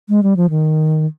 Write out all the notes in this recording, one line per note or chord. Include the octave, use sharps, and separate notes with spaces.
G#3
G3
F3
D#3